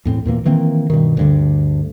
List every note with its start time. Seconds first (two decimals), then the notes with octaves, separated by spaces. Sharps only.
0.05 E2 A2 C4
0.25 E2 A#2 E3 A#3
0.45 D#3 E3 A#3 C4
0.90 G2 B2 D#3
1.17 D2 G2 D3